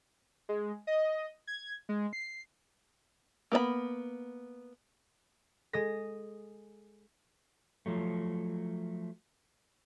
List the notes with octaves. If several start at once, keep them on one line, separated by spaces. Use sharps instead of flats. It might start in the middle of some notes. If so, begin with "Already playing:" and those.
G#3
D#5
G#6
G#3
C7
A#3 B3 D5 B5
G#3 A4 D#6 A#6
F3 F#3 A3